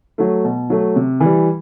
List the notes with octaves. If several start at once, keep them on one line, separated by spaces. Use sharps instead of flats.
F#3 A3
B2
F#3 A3
C3
E3
G3